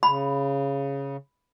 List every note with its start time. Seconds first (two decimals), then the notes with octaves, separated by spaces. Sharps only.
0.03 C#3 B5